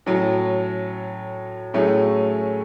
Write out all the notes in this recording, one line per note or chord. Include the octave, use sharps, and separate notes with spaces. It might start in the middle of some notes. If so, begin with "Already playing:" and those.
A2 F#3 C#4
A2 F#3 A3 C#4 G#4